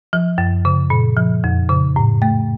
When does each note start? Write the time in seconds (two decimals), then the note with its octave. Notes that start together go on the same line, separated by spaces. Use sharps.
0.13 F3
0.38 F#2
0.65 C#3
0.90 A#2
1.17 F3
1.44 F2
1.69 C#3
1.96 A2
2.22 A3